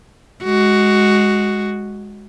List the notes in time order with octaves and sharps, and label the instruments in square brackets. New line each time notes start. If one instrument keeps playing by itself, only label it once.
[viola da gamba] G#3 F#4